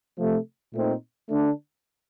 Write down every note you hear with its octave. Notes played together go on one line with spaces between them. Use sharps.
C3 F3 A3
A#2 A3 C4 D#4
D3 A3 D4